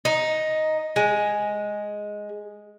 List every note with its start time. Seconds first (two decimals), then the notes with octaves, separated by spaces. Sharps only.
0.05 D#4
0.96 G#3